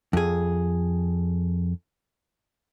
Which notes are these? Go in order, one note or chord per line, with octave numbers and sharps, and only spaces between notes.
F2 G#4